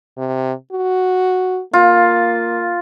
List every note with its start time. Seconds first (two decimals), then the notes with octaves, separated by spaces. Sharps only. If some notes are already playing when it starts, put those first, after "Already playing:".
0.18 C3
0.72 F#4
1.73 A#3 F4